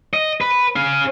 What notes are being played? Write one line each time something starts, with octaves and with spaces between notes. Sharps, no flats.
D#5
B4
C#4 F5